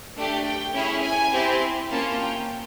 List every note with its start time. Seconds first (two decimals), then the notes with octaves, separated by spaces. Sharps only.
0.16 A3 D4 G4
0.45 G5
0.74 C#4 E4 G#4
1.03 G#5
1.33 C4 E4 G4
1.90 A#3 C#4 F4 A5
2.20 G5